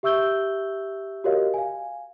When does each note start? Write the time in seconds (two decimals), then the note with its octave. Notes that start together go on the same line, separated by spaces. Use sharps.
0.03 G4 E5 C#6 E6 G6 G7
1.24 F#4 G4 A#4 C#5 D#5 F5
1.54 F5 G#5